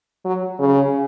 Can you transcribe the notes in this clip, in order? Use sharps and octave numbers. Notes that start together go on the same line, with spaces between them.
F#3
C#3